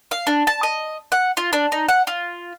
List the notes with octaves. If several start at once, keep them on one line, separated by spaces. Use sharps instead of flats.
F5
D4
A5
D#5
F#5
F4
D4
D#4
F#5
F4